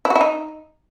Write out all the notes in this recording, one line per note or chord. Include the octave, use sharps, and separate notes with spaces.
E4
F#4
E4
D#4